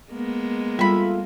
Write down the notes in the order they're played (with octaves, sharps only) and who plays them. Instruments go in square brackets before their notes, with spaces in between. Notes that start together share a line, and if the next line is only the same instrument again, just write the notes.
[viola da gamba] G#3 A#3 B3
[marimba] G3 [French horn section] A3 F4 [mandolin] E5 B5